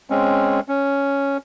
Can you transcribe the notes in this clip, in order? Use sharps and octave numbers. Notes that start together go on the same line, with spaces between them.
G#3 C4 C#4
C#4